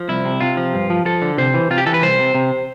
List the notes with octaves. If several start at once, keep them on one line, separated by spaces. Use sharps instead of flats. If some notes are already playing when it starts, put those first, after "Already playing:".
Already playing: F3
C2 E4
C3
C3 F4
F3
G2
F3
F3 A4
D3
C3 C5
E3
C3 F4
G4
E3 A4
B4
C2 C5
C3
C3